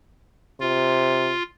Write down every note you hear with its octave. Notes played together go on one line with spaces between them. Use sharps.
C3 F4